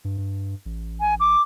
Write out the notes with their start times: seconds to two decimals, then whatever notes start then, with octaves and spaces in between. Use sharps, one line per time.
0.05 G2
0.18 G2
0.66 A1
1.00 G#5
1.20 D6